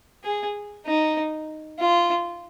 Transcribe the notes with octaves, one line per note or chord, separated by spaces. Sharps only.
G#4
D#4
F4